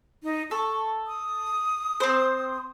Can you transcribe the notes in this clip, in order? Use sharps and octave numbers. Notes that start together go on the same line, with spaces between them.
D#4
A4 C#6
D#6
C4 C5